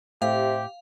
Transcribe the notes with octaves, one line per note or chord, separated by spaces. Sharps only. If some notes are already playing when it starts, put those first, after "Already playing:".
A2 C3 G4 F5